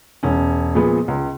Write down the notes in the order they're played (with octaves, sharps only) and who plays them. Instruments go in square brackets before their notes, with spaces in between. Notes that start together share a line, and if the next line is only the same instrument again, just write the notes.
[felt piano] E1 C#4
A#2 F3 G#3 B3
C#2